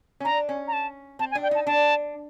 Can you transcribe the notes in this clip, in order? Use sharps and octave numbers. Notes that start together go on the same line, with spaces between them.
C#4
D4 A#5
C#4
A#5
A5
C4 A5
G#5
D4
G5
D#4 A5
D4 A5